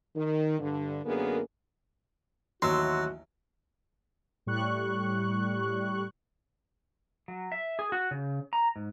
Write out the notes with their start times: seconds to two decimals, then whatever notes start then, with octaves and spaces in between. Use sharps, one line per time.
0.15 D#3
0.60 G2 D3
1.04 F#2 D3 A#3 B3 G#4 A#4
2.62 A1 D#2 F#3 F#4 E5 C6 E6
4.46 A2 G3 C#6 F#6
7.28 F#3
7.52 E5
7.79 G#4
7.92 F#4
8.11 C#3
8.53 A#5
8.76 G#2